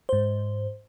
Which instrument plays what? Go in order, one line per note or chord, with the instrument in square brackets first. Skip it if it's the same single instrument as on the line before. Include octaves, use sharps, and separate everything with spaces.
[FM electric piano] G#2 C5